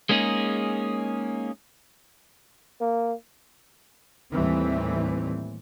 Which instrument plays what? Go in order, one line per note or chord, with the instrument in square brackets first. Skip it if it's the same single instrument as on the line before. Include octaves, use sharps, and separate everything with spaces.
[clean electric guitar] G#3 A#3 C#4 D#4 G#4
[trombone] A#3
[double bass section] D#2 A2 E3 G3 C4